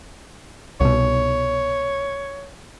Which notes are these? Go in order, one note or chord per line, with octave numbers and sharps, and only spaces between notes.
C2 B2 C#5